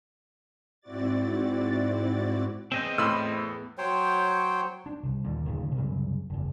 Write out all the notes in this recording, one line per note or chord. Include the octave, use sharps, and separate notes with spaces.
G#2 C4 E4 F#4 D5 A6
B3 C4 G#4 D#5 G6
A2 B5 C6 E6
F#3 C5 C#5 G5
D4
C2
D#2 A#2 D3
D1 D#2 A#2 C#3
C2 F#2 C#3 F#3
F#1 E2